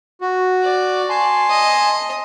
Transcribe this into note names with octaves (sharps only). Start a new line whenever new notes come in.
F#4
D5
G#5 A5 C6
D#5